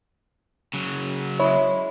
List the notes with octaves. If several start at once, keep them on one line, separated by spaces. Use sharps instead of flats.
C#3 F#3
G#3 E4 C#5